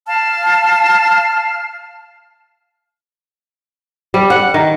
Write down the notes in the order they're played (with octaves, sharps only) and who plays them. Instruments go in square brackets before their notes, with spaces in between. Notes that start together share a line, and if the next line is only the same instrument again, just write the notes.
[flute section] F5 A5 F6
[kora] G3
F#5
D#3